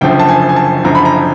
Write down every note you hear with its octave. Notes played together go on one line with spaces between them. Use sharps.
F#1 F#2 D3 F3 G5
A5
G#5
G#5
A5
F#1 F#2 D3 F3 A#5
B5
A#5